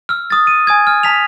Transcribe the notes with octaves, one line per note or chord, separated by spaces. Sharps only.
E6 F6
D#6 A6
D#7
G#5 D#6 G#6
F6
A5 B6 F7